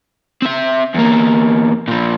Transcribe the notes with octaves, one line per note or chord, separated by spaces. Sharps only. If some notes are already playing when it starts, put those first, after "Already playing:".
C4 E5
E2 A#3
A#2 F3